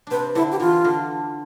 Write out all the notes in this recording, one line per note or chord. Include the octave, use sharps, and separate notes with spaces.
C3 C4 D4 B4
D3 D4 E4
G4
E3 E4 F4
D3 D4